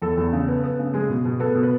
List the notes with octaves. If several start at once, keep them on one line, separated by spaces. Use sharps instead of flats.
E2 A4
E2
C#3
B3
B3
C#3
G#3 G#4
B2
B2
B3 A4
B2
B4